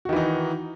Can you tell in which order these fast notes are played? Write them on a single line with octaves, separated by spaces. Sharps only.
F#4 D#3 E3 D#4